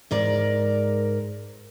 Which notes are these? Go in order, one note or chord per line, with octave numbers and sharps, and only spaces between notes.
G#2 A#4 D5